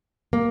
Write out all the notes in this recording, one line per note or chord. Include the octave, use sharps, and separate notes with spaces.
A#3